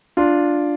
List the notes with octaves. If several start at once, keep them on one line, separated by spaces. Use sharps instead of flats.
D4 F4